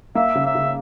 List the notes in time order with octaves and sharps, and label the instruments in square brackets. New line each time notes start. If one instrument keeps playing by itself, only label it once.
[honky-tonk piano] A#3 [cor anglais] E5
[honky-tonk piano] C#3
[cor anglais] E5
[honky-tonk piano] C#3